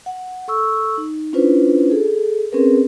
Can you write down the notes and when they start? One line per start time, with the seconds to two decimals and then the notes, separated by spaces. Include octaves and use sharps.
0.06 F#5
0.48 A4 C#6 E6
0.98 D#4
1.33 C#4 D4 E4 F4 B4 C5
1.90 G#4 A4
2.52 C4 C#4 G#4 A#4 B4